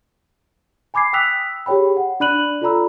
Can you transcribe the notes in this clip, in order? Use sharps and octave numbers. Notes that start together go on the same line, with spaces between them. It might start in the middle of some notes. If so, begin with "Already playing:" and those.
G#5 B5 D6 G#6 C7
G5 D#6 E6 F#6 B6 F7
G4 G#4 C#5 G5 B5
F#5
D4 D5 B5 F#6 D#7 F#7
F4 A4 D5 A#5 B5 E6